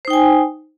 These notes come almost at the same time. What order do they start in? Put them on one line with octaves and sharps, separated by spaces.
C5 D#4 G5 G#5